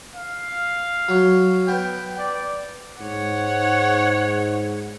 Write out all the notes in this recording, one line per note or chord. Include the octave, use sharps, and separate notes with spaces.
F5
F#3
B3 G5
D5
G#2 C#5 F#5